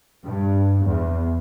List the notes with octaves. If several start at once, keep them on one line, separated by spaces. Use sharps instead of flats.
G2
E2